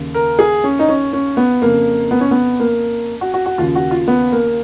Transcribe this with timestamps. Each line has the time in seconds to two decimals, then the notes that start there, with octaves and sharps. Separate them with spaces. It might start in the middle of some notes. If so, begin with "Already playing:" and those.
Already playing: D#2 C#3
0.15 A#4
0.39 G#4
0.64 C#4
0.79 D#4
0.89 C#4
1.13 C#4
1.37 B3
1.62 F2 C#3 A#3
2.11 B3
2.21 C#4
2.31 B3
2.60 A#3
3.21 F#4
3.34 F#4
3.46 F#4
3.58 D#2 C#3 F4
3.75 F#4
3.91 F4
4.08 B3
4.32 A#3